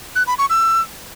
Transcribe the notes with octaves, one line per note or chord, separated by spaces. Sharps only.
F#6
B5
C#6
E6